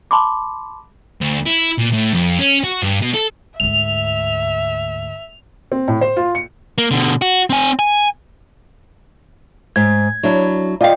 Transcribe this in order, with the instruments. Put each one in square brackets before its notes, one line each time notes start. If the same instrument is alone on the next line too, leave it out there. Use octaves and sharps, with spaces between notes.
[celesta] A5 B5 C6 D6
[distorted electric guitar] D2
E4
A#2
A2
F2
C#4
F#4
G2
B2
A4
[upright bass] D2 G#2 [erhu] E5 [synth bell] F7
[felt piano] C4
A2
C5
F4
C#7
[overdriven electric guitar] A#3
B2 D3
F#4
C4 G#5
G#5
[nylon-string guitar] G#2 [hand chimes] G#6
[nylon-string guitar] F#3 D4 E4
[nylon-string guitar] F4 F5 [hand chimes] D5 D#5 G5